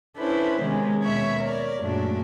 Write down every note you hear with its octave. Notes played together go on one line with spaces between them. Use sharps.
C#4 D4 E4 A4 B4 C5
C3 D#3 G#3 B3 C#4
D#2 B2 C#5 E5 B5
A#4 C#5 D5
F#2 A#2 G#3 A3 D4 F#4